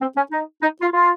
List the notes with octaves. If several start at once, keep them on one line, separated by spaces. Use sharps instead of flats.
C4
C#4
D#4
D#4
F4
F4